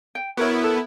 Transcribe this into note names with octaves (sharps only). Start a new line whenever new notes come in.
G5
B3 E4 F#4 A#4 C#5
A4